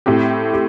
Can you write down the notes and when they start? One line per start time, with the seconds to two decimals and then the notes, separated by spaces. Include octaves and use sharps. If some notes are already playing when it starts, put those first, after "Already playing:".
0.06 A2 A3 C4 G4
0.53 G4